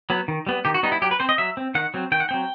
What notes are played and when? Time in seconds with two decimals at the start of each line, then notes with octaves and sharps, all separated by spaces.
0.10 F#3 B3
0.28 D#3
0.47 G3 B3
0.65 D#3 G4
0.74 F#4
0.83 G3 B3 D#4
0.92 E4
1.02 F#3 G4
1.11 B4
1.20 C4 C5
1.29 D#5
1.38 F#3 E5
1.57 C4
1.75 D#3 F#5
1.94 F#3 C4
2.12 D#3 G5
2.20 F#5
2.29 F#3 C4 G5